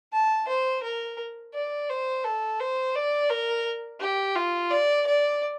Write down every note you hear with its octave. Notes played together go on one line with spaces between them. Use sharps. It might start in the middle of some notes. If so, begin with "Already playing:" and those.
A5
C5
A#4
D5
C5
A4
C5
D5
A#4
G4
F4
D5
D5